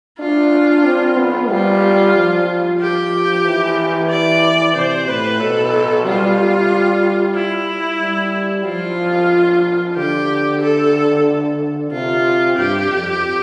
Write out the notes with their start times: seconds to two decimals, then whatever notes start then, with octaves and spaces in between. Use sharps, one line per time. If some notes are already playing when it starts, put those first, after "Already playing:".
0.19 D4 F4
0.85 C4
1.17 B3
1.50 G3 F4
2.15 F3
2.81 G4
3.46 E3
4.10 D5
4.75 C3 C5
5.08 A2 B4
5.40 B2 A4
6.05 G3 F4
7.35 E4
8.01 G3
8.66 F3 F4
9.96 D3 G4
10.61 A4
11.91 C3 F4
12.57 G2 G4
12.90 F2